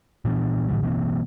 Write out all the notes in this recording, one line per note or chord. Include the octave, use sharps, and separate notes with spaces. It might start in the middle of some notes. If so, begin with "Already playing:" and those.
A#2 E3 B3 D4
A2 D3 E3 G3
B2 E3 A#3 C4